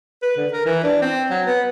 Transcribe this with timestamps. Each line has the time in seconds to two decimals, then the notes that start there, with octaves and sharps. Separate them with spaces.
0.22 B4
0.37 D3
0.52 A#4
0.66 E3
0.83 D4
1.02 C4
1.30 F#3
1.46 B3